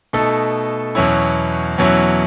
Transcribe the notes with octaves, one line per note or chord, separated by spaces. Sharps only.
B2 A3 D#4 A4
E2 B2 F#3 C#4 E4
E2 B2 F#3 C#4 E4